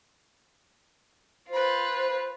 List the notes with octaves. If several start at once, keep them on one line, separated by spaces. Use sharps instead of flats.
F4 B4 C5